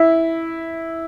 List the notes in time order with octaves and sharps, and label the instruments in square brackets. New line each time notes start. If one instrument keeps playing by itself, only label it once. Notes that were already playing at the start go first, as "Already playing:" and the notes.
Already playing: [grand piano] E4